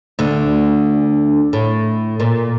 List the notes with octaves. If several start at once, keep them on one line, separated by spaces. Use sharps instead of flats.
D2 D3
A2
A#2